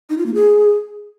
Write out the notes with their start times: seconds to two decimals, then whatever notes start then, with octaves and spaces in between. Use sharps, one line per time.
0.10 D#4
0.18 F4
0.26 A#3
0.34 G#4